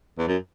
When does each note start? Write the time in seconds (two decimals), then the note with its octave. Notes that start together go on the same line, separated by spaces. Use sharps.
0.18 E2
0.28 F#2